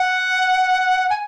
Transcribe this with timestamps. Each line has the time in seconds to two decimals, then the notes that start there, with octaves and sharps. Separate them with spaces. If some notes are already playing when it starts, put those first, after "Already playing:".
Already playing: F#5
1.10 G#5